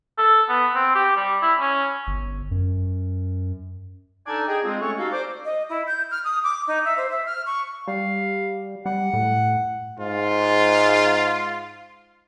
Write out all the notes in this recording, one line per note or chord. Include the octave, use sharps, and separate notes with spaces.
A4
B3
C4
G4
G3
E4
C#4
G1
F#2
D4 D#4 A4 D5 G#5 A5
G#4 D#5 G5
G#3 C4 F4
A3 C#4 A4 C#5 F#5 C#6
D#4 F#4 G4 A4 F5
C5 D5 D6
D#5
E4
G6
F6
D#6
D6
D#4
E5
C5
E5
F6
C#6
G3 F5
G3 F#5
A2
G#2 F4